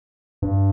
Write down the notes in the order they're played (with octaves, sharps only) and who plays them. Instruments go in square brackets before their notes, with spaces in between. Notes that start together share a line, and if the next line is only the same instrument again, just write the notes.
[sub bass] G2